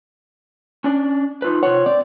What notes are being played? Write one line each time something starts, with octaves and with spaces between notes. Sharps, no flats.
C#4 D4 D5
D#4 F4 B4
C3 F4 C#5 F#5
C4 D5